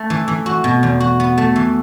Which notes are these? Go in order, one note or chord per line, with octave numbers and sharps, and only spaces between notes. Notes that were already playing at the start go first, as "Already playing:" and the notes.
Already playing: A3
E3
E3
F#4
B2
E2
F#4
B3
A3
E3